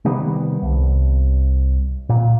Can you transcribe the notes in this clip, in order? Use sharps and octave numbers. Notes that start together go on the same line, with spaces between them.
C3 D#3 G3 B3
C2
A#2